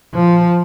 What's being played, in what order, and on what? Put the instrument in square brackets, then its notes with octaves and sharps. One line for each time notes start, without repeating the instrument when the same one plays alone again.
[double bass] F3